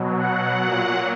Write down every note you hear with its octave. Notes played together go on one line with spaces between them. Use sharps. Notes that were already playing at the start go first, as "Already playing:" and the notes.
Already playing: B2 F#3
F#5
A#2 F#3